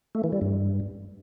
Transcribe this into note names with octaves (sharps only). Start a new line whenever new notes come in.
A3
E3
G3
G2